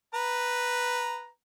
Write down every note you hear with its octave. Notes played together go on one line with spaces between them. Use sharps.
B4 A#5